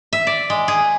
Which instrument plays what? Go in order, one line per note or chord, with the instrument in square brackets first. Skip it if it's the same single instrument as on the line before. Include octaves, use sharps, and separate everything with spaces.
[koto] E5
D5
G#3
G#4